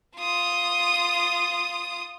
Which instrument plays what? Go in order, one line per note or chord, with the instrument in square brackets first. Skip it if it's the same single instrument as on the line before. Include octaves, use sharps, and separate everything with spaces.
[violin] F4 D#6